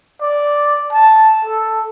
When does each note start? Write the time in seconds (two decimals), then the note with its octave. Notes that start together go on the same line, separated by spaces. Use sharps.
0.21 D5
0.93 A5
1.45 A4